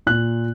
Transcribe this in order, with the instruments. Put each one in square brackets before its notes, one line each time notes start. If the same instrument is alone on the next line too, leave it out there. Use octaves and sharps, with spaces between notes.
[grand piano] A#2 F#6